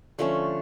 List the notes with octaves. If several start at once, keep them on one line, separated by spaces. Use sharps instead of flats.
D3 F3 A3 C#4